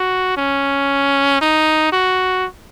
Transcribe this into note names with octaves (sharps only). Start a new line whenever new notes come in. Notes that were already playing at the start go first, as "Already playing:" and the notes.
Already playing: F#4
C#4
D#4
F#4